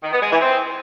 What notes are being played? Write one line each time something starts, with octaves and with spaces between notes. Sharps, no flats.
D#3
B3
G#3
E3
C4